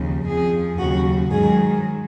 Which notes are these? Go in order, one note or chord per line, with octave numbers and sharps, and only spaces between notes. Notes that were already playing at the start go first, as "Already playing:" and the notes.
Already playing: D#2 C#3 F3
F2 F3 G#4
D#2 C#3 F#3 F#4
G#2 D#3 F#3 G#4